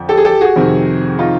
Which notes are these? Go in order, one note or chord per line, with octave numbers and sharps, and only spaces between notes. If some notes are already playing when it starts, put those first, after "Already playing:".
Already playing: F2 D3 F3
G4 A4
G#4
G4 A4
F#4 G#4
F2 C3 D#3
D#4 F4